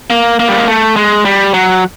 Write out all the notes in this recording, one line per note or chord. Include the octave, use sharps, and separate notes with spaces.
A#3
A#3
G3
G#3
A3
G#3
G3
F#3